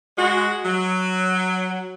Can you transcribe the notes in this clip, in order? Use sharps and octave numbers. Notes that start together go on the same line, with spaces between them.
G#3 F#4
F#3